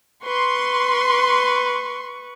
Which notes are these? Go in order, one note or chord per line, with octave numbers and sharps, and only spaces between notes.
B4 C6 C#6